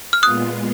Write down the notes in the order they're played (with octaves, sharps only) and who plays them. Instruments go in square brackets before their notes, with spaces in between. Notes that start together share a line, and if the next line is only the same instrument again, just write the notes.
[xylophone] F6
[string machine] A#2 G#3 B3 F4 [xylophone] D#6 F#6